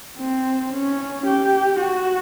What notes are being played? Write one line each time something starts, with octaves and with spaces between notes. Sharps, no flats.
C4
C#4
G4
F#4